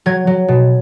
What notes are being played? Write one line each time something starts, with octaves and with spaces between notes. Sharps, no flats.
F#3 G#6
F#3
B2